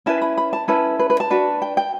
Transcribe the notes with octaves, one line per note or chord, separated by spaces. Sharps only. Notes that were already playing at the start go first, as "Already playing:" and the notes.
C#4 E4 B4 A5
B5
B5
A5
C#4 E4 A4 B4
B4
B4
A5
D4 F#4 B4
G5
G5